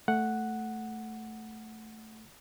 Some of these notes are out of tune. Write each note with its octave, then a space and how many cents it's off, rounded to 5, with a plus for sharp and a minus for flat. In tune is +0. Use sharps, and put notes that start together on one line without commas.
A3 +0 F#5 +0